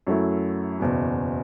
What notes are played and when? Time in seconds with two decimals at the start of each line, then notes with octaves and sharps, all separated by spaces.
0.07 F#2 F#3 A3 E4
0.80 F#1 E2 B2